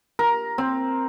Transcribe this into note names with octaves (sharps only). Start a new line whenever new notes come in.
A#4
C4